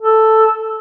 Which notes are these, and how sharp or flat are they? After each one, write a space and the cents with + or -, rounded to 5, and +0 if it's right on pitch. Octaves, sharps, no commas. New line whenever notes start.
A4 +0